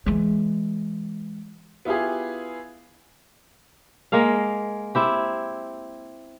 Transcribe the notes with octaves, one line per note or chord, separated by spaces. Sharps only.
E3 G#3
B3 E4 F4 G4 G#4
G#3 A#3 G#4 F5
C4 E4 G4